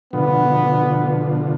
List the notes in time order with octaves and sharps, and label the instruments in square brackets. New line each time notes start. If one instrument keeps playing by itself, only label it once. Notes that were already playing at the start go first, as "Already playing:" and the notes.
[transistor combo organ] B2 D3 F3 [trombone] B3